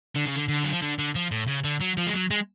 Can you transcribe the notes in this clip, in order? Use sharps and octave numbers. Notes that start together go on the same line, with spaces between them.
D3
C#3
D3
D3
F#3
F3
D3
D3
F3
A2
C#3
D3
F#3
F3
G#3
F#3
G#3